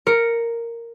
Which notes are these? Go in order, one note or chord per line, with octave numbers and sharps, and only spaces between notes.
A#4 C#7